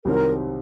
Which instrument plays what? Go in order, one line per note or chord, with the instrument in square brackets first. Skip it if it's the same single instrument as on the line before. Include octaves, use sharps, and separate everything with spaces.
[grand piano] C2 C3 D#3 F#3 C4 [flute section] A#4